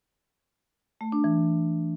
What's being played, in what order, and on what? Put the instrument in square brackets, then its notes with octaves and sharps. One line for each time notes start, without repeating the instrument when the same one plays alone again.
[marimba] A3
D4
E3